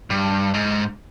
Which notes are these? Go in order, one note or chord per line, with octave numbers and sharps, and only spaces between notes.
G2
G#2